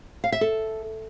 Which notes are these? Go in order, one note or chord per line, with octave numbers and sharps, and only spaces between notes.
F5
E5
A4